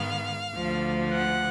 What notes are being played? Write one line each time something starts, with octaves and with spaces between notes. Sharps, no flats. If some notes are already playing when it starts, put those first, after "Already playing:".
Already playing: G#2 D#3 G#3 B3 F5
D2 D3 F3
F#5